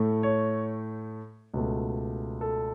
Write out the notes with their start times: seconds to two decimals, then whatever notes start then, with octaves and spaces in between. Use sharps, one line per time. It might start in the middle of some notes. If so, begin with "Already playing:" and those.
Already playing: A2 A3
0.23 C#5
1.54 C#2 B2 A3
2.41 A4